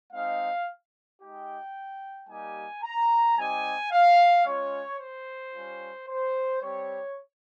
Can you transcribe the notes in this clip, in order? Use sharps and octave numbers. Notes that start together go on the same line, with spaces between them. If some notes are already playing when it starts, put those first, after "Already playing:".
G#3 C4 D#4 F5
G#3 D#4 G4 G5
G3 A#3 D#4 G4 G#5
A#5
G3 C4 D#4 G4 G#5
F5
G#3 C#4 F4 C#5
C5
G3 C#4 F4
C5
G3 C4 G4 C#5